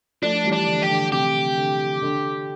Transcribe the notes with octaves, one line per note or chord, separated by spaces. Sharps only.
F3 A3 D4
E3 G3
D4
D3
G4
D3
C3 G4
D3
D3